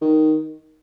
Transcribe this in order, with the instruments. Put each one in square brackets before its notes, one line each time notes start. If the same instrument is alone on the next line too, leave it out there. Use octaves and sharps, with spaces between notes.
[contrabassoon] D#3